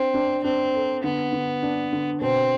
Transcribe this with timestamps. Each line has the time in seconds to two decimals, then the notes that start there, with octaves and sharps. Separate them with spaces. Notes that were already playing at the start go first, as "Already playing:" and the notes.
Already playing: C4 D4
0.14 D4
0.44 C4 D4
0.74 A4
1.04 D3 B3
1.33 D3
1.63 D4
1.93 D3
2.21 B2 C4